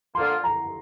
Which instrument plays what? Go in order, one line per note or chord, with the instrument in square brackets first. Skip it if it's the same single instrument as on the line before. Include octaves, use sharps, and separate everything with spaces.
[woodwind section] D3 F3 A#3 F4 [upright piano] C6
[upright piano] A#5